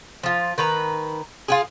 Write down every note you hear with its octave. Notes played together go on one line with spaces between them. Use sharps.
F3 F4
D#3 B4 A#5
F4 G4 G#4